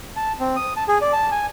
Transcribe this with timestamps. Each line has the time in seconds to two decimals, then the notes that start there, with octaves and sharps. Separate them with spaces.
0.16 A5
0.40 C4
0.56 D#6
0.77 A5
0.88 G#4
1.02 D5
1.13 A5
1.32 G#5